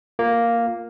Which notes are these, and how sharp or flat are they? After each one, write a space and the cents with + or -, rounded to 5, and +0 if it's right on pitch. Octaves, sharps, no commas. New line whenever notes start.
A#3 +0 F4 +0